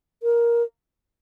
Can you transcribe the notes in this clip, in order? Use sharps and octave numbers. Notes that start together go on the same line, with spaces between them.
A#4